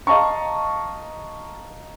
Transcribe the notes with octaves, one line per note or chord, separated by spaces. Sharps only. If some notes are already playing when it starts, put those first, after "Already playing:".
D#5 F5 A5 A#5 C#6